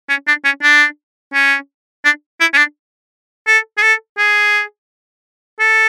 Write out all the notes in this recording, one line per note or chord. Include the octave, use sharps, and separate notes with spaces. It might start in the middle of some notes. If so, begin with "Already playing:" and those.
C#4
D4
C#4
D4
C#4
D4
E4
C#4
D4
A4
G#4
A4
G#4
A4